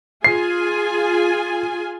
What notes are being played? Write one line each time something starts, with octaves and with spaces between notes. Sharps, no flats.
F4 G#4 G#5 C7